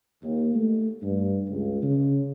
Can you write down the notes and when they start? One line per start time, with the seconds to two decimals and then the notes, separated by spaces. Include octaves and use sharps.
0.23 D#2
0.54 A3
1.02 G2
1.49 C#2
1.82 C#3